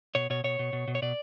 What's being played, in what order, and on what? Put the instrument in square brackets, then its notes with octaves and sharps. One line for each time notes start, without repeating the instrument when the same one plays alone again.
[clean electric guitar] B2 C#5
B2 C#5
B2 C#5
B2
B2
B2
C#5
B2 D5